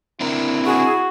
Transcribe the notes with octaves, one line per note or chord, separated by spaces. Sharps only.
C4 D4 E4 A#4
F#4 G#4